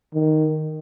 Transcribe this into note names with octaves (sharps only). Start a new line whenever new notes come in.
D#3